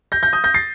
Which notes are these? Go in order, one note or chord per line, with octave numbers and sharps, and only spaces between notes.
G6 A#6
G6 A#6
D#6 G6
G6 A#6
A6 C7